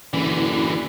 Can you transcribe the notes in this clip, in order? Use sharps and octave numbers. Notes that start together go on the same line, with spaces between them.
F#1 D3 E3